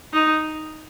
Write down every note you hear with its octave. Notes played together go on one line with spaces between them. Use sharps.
D#4